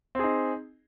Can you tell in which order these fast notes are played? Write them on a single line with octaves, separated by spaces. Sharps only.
C4 G#4 D#4